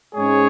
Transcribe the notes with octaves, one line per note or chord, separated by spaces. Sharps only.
G#2 G#3 C#4 G#4 C#5